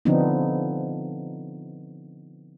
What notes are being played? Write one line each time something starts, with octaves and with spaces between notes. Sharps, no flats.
D3 F3 B3 C4 D4 D#4